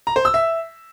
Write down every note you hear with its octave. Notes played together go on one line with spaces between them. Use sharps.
A#5
C5
E6
E5